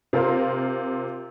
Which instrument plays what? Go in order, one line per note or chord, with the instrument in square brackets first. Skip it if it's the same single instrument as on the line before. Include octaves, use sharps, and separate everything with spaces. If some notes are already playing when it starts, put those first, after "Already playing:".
[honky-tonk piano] C3 F4 A#4 C5 F5 C6